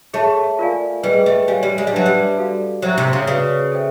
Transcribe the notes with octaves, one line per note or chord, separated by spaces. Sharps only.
A3 G#4 C#5 E5 A5
F4 A#4 D5 F5 G#5
G3 G#4 B4 D#5 G5
A3
G3 C#5 F5 G#5
G3
G#3
G3
F#3 D4 G4 B4 E5 A5
G3
F#4 A4 D5 F5
F#3 C5 E5 G5 A#5 C#6
C3
C#3
C#3 F#4 B4 D5
A4 C5 E5 G5